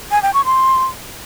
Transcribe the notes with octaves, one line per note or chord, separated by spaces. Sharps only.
G#5
G5
C#6
C6